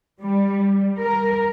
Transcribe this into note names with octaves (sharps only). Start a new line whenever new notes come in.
G3
A#4